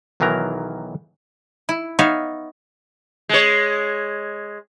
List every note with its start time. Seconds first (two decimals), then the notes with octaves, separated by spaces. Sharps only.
0.20 B1 D#3 E3 F#3 A#4 A#5
1.69 E4
1.99 B3 D#4 C#5 E5 F5
3.29 G#3 C#5